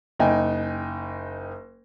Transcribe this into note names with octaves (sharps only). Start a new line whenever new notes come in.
F#1 D#4 G5 G#5